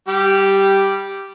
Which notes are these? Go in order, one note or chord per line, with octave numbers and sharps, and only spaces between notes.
G3 G4